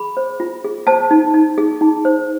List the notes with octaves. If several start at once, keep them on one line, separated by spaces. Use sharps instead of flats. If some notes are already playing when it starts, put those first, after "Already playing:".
Already playing: G#4 B5
C5
F4
G#4
C5 A5
D#4
D#4
G#4
D#4
C5